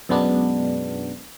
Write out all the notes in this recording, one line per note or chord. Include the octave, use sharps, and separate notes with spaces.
F#2 B2 G#3 B3 D4